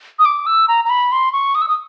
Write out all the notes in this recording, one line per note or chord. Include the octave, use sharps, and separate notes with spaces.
D#6
D6
E6
A#5
A#5
B5
C6
C#6
D#6
E6
D#6